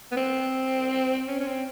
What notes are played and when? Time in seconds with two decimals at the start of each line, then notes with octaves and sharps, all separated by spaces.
0.12 B3
0.17 C4
1.28 C#4
1.40 C#4
1.47 C4